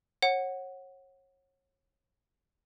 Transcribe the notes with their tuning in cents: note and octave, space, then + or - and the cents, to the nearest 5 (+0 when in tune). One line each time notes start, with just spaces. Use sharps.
C#5 -30 F#5 +0